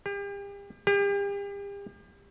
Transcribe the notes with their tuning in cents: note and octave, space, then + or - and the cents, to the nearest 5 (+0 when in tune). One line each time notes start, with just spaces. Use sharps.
G4 +40
G4 +40